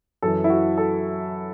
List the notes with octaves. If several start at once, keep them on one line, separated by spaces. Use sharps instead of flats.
F#2 E3 A4
E4
F#4
A4